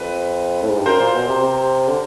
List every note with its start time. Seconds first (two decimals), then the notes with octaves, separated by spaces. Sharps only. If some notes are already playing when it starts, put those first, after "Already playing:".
Already playing: F2 B4
0.62 A2
0.70 G#2
0.78 G2
0.85 F#2 A#4 C5
1.00 A#2
1.14 B2
1.28 C3
1.42 C3
1.88 D3